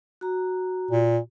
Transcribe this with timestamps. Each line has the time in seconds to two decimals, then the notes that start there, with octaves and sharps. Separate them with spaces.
0.21 F#4 A#5
0.91 A#2